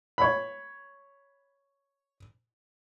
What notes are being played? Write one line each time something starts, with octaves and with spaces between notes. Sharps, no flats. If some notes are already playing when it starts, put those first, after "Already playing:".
C#5 B5